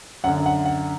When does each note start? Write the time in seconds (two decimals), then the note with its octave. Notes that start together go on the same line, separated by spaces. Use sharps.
0.24 F#2 D3 F#5
0.46 F#5
0.65 F#5